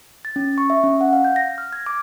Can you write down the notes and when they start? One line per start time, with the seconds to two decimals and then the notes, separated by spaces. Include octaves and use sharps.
0.25 A6
0.36 C#4
0.58 C#6
0.70 E5
0.84 C#4
1.01 F#5
1.13 F5
1.25 G6
1.36 A#6
1.58 F6
1.73 G#6
1.86 D6